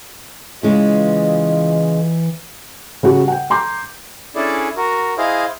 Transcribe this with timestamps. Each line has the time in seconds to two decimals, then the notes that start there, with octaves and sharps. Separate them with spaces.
0.63 C#3 E3 G#3 E4 F4 D#5
3.03 C#3 G3 F#4
3.28 F#5 G5
3.50 A#5 C6 D6 G6
4.35 C#4 D4 E4 G#4 A4 D5
4.76 F#4 A#4
5.18 E4 G#4 C5 D#5 F5